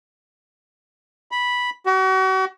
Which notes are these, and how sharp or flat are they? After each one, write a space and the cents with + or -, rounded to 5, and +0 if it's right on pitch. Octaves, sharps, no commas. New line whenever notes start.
B5 -5
F#4 +40